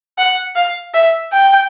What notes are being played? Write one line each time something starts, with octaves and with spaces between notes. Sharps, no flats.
F#5
F5
E5
G5